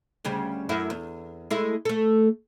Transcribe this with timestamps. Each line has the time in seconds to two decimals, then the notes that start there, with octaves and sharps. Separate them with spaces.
0.25 D2 C#3 G3
0.69 F#2 A3 E4
0.90 E2
1.51 G#3 A3 E4
1.85 A3 A4